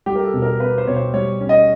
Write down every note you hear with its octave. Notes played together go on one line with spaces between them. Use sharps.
G3 G4
A#4
A4
B2
A#4
B3 B4
C5
B2 C#5
C5
G3 C#5
C#4
D#5